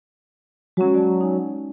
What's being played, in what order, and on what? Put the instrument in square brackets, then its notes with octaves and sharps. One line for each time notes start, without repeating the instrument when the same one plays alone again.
[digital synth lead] F#3 [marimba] G#3 C#4
[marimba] D5 A5
D#4 G#5